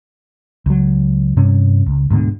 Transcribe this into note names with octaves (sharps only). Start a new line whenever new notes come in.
C#2 F#3
G2 C3 C#4
C#2
D2 G#2 B2 D3